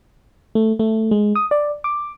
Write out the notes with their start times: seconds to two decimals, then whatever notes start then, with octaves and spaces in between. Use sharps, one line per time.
0.55 A3
0.79 A3
1.11 G#3
1.35 D#6
1.51 D5
1.84 D6